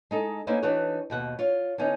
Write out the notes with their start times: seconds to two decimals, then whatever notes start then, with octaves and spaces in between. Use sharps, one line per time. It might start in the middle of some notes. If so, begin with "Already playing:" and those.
0.11 G#3 D#4 A4
0.47 A#3 C#4 D#4 E4 B4 C5
0.62 E3 D4 D#4 F#4 B4 C#5
1.10 D#2 B2 F#5
1.39 F4 C#5
1.78 D3 B3 C#4 D#4